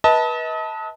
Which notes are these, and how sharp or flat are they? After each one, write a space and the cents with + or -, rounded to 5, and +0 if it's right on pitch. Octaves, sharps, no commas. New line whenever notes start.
B4 -25 D#5 +40 A5 +0